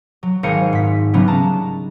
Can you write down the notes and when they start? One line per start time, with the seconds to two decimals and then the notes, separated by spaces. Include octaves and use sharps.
0.23 F#3
0.43 G#1 A#4 C5 F5 G#5 C#7
0.73 G#2 B6
1.14 C#3 E3 F#3 G3 B3 C#4
1.27 D4 D#4 A5 A#5